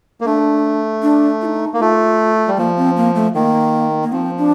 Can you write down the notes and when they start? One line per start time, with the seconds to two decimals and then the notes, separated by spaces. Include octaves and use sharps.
0.21 A#3
0.25 A3 D4
1.02 D4
1.41 F4
1.45 D#4
1.74 A#3
1.80 A3 F4
2.48 G3
2.57 F3 A#3
2.77 C4
2.97 A#3
3.15 A3
3.35 D#3 A#3
4.03 A#3
4.12 F3 C4
4.38 D4